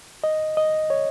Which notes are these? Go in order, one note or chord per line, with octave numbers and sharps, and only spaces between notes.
D#5
D#5
C#5